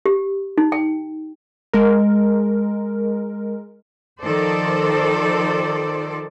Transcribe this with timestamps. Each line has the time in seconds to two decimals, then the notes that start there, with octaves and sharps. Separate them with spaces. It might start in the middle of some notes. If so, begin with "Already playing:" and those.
0.06 G4
0.58 D#4
0.72 G5
1.73 G#3 A#4
4.22 D#3 F3 A4 C5 D5